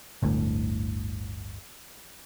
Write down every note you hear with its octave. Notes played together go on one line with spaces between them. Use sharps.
G1 D2 A2